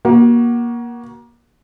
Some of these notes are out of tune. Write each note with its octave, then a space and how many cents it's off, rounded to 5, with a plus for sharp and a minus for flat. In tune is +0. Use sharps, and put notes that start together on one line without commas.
A#3 +25 F#4 +10